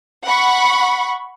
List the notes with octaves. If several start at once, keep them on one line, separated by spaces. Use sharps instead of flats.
F#5 B5 C#6